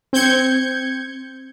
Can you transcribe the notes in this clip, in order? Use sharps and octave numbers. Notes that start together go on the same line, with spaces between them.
C4 G6 G#6 C#7